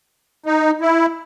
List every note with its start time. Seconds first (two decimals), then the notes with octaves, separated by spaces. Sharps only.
0.46 D#4
0.81 E4